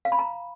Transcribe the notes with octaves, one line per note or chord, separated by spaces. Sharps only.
F5
B5
A#5